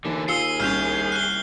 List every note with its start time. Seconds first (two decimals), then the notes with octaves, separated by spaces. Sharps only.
0.05 D#2 D3 E3
0.28 F4 G#4 E6 C7 C#7 G7
0.60 C2 C#4 F6 G6 F7
1.12 F#6 G7